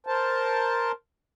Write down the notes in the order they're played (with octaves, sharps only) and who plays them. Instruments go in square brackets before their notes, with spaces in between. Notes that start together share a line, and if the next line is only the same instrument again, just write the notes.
[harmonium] A#4 C5 A5